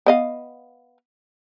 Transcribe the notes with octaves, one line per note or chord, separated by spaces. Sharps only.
B3 D#5 F5